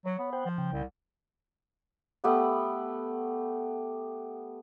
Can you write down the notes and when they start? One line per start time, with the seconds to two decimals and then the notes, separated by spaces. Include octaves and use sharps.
0.06 F#3 C#5
0.19 B3
0.33 C5 F#5 G5
0.45 F3
0.58 C#3 G5
0.72 C2
2.24 A3 B3 G4 F#5